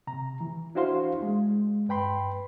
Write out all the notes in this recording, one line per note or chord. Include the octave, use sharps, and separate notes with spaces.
C3 A#5
E3
D4 E4 F#4 C5 F5 C6
G#3
G2 B4 G5 B5 C6